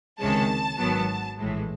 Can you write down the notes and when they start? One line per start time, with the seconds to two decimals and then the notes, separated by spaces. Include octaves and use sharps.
0.20 C#2 C3 D#3 G#3 C#4 A5
0.78 G#1 G#2 D#3 F#3 B3
1.38 A#1 A2 E3 G#3